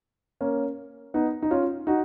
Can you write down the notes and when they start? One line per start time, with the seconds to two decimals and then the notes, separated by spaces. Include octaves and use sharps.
0.41 A#3 C#4
1.14 B3 D#4
1.42 D#4
1.51 C#4 F4
1.87 D#4 F#4